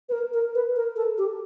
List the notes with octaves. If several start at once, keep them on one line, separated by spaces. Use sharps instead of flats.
B4
A#4
A#4
B4
A#4
A4
G4